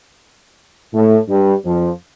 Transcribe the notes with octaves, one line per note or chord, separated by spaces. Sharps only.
A2 A3
G2 G3
F2 F3